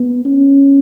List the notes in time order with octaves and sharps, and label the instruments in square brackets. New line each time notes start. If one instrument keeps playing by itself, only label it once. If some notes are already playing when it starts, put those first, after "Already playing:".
Already playing: [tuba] B3
C#4